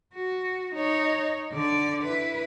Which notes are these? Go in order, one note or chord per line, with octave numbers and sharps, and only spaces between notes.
F#4
D#4 C#5
D3 D5
E4 B4